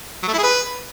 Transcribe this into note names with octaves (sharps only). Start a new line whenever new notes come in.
F#3
A3
E4
G#4
B4